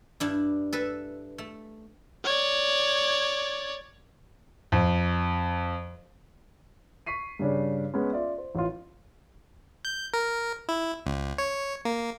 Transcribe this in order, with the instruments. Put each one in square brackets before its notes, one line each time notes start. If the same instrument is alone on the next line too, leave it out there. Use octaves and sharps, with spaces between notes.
[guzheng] G2 D4 E4
A4 B4 E5
A3
[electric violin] C#5 D5
[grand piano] F2
C#6 B6 C7 D#7
G2 C#3 D4
G#3 B3 C#4
F4 D5 E5
C5
A1 F4
[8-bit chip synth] G6
A#4
E4
C#2
C#5
A#3